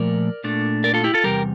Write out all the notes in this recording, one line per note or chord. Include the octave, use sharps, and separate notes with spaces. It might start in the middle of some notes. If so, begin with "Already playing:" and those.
Already playing: A#2 F3 A3 A#4 D5
A#2 A3 D4
A#4 D5
F4 A4
E4 G4
F4 A4
E2 C3 G3 G4 A#4